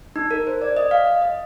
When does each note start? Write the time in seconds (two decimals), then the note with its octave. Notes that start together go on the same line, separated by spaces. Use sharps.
0.16 D#4
0.31 A#4
0.47 C5
0.61 D5
0.77 D#5
0.91 F5
1.07 D#5
1.22 D#5